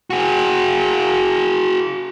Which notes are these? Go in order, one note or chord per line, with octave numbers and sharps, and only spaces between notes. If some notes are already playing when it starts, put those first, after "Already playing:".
F#4 G#4